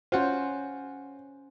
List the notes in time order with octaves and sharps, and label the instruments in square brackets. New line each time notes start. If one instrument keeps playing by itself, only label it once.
[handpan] C#4 C5 [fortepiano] F4 F#4